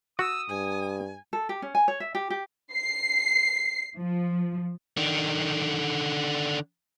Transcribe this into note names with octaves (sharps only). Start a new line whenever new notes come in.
F#4 D#6 E6
G2 G#5
A4
G4
C#4
G#5
C#5
E5
G4
G4
C7
F3
D3 D#3